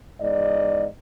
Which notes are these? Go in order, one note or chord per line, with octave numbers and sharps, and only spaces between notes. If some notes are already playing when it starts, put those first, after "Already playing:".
E2 G#2 D5 D#5